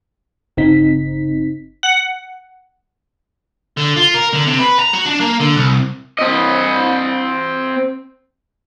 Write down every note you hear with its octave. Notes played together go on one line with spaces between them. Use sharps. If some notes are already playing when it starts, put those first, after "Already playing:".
G1 C#3 C4 D#4 B6
F#5
D3
F4
A#4
D3
C3
B4
A#5
F#4
D4
A#3
D3
C2
C4 D#5